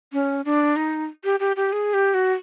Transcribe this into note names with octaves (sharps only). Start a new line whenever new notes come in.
C#4
D4
D#4
G4
G4
G4
G#4
G4
F#4